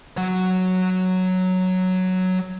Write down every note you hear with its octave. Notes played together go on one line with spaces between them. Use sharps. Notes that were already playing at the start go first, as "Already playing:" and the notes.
F#3 F#5